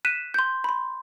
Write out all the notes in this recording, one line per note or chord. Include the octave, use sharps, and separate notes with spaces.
F#6 B6 D#7 E7
C6 G6
B5 C6